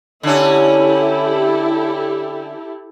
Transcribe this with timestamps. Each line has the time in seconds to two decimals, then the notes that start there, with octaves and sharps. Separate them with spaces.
0.23 D3 C#4 E4 G4 A4